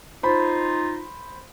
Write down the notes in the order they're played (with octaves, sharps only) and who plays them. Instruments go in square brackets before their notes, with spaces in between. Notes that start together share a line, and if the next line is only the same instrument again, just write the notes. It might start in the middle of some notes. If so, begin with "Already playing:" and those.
[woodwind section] D#4 F4 [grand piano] C5 B5